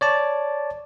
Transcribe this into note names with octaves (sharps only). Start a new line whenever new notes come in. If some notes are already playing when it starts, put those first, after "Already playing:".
C#5 D5 A5